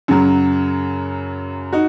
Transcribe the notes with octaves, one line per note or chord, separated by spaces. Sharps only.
F#2 C#3 F#3
D#4 F#4